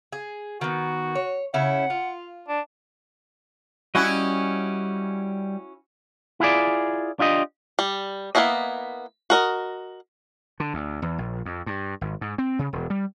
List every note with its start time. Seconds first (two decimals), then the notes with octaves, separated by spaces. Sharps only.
0.13 G#4
0.61 D#3 B3 F#4
1.15 C#5
1.54 C#3 C#4 E4 F#5
1.90 F4
2.49 D4
3.95 G3 C#4 E4 F#4 D#5
6.40 E4 F4 G#4 D5
7.19 D4 F4 G4 D#5
7.79 G3
8.35 A#3 B3 C#4 E4 D#5
9.30 F#4 A#4 D#5
10.60 D3
10.74 D2
11.02 E2
11.18 A#1
11.45 F2
11.66 G2
12.01 G#1
12.21 G#2
12.38 C4
12.59 C#3
12.73 E1
12.90 G3